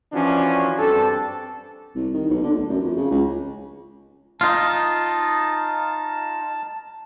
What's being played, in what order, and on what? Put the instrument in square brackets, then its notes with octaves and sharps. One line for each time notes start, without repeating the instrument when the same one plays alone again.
[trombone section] E3 F3 C#4 D4 F#4
G2 C4 D4 A4
[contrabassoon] C2
D#3
B1
D3
D2
F#2
F2
C#3
C#2
[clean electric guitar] D#4 F4 [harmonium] A5